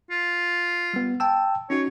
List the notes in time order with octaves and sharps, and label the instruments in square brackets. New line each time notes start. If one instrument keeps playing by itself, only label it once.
[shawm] F4
[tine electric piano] G3 B3
G5 A5 E6
[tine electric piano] C#4 D#4 F#4 [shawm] C#5